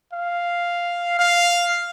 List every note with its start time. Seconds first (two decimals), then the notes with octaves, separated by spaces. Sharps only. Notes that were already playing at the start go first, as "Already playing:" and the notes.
0.13 F5
1.19 F5